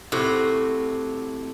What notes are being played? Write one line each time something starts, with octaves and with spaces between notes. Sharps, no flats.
A2 C3 F#4